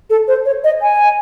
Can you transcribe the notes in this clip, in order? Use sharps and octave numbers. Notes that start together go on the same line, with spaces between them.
A4
C5
C#5
D#5
G#5